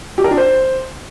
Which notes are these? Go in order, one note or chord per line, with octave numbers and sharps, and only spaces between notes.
G4
A#4
D4
C5